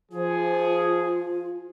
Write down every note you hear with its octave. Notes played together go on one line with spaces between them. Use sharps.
F3 F4 G#4